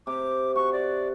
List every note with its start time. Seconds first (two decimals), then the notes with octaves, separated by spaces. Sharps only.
0.07 C3 D6
0.55 F#4 C#6
0.73 D5